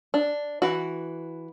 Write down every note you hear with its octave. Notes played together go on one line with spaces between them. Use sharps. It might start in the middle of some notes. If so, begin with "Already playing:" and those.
D4
E3 F#4